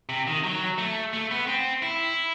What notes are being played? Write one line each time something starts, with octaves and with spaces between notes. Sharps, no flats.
C3
D#3
F#3
A3
A3
B3
C4
E4